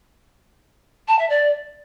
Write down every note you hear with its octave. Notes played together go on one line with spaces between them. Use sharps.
A5
E5
D5